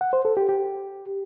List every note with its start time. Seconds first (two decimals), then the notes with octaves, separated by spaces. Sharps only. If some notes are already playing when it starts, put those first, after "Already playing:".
0.01 F#5
0.13 C5
0.25 A4
0.37 G4
0.49 G4